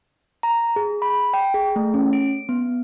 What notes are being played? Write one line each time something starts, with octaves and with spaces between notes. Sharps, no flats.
A#5
G#4
B5
G5
G#4
A3
C#4
D7
B3